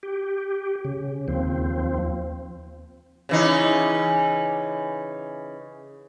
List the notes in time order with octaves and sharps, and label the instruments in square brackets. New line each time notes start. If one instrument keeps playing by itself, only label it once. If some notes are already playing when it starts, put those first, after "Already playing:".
[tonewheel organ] G4
C#3
D#2 F3 C4
[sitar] C#3 E3 D#4